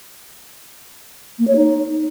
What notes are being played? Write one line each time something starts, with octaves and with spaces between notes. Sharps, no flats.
A#3
C#5
D#4